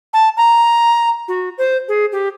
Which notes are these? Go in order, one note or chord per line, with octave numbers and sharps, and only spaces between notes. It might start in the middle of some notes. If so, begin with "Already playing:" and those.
A5
A#5
F#4
C5
G#4
G4